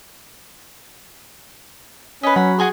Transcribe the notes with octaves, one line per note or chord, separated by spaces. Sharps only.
C#4 B4 D#5 B6
F#3 F#5 B5
F#4 G#4 G#5 C6